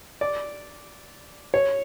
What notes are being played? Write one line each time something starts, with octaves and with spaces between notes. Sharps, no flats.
D5
C#5